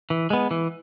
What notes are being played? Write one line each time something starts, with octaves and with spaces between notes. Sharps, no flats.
E3
G#3 B3
E3